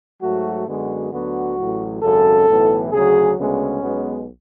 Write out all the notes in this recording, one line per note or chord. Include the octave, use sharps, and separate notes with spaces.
G#2 F#3 A3 F#4
F#2 D3 G#3 B3 F#4
D2 D3 F#3 B3 F#4
A1 A2 F#3
G#1 F#2 C#3 A4
B1 A2 E3 B3
D2 C#3 F#3 G#4
D2 C#3 G#3 B3 C#4
B1 B2 G#3 B3